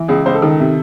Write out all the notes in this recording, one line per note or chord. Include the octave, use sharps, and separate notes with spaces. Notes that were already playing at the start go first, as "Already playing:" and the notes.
Already playing: E3
C#2 G#4
C#2 C5
A4
D#3
C3